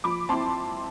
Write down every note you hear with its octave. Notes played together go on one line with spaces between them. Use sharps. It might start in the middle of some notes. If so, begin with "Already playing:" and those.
F3 B5 D6
C4 E4 A5 C6